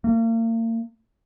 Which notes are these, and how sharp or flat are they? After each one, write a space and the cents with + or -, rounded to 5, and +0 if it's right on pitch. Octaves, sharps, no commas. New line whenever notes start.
A#3 -40